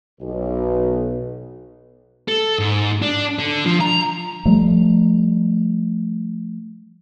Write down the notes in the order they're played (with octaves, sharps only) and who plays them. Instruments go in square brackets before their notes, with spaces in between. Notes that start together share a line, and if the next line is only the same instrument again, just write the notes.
[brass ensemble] B1
[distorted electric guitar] A4
G#2
D4
D3
F3
A#5
[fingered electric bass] F3 G3 A3